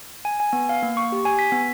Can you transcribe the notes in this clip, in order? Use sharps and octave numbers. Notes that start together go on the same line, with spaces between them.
G#5
G#5
B3
F5
A#3
C#6
G4
G#5
B6
B3